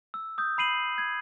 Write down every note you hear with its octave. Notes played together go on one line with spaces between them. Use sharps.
E6
D#6 G6
B5 C7 D#7 F#7
G#6